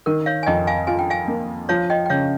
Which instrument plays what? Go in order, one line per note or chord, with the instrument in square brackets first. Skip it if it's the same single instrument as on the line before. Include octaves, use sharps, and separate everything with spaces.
[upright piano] D#3 [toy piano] A#4
[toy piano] C#5 F5
G#5
[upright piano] F2 [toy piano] D#5 G5
[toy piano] F5 G#5
[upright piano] F4 [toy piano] G#5
[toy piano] G5
F5 G#5
[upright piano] A#3
[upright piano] F3 [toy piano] C#5 F5
[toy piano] D#5 G5
G5
[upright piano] C#3 [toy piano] C#5 F5